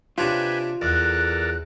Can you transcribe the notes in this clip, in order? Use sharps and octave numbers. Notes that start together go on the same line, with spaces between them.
C3 D4 F4 B4 C#5 G5 G#5
E2 A4 A#4 D5 F#6